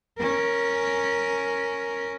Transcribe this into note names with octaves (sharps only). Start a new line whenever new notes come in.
C#4 A#4